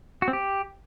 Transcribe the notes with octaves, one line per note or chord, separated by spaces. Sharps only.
F#4
C4
G4